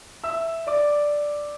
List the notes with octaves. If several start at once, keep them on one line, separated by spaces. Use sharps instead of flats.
E5 E6
D5 D6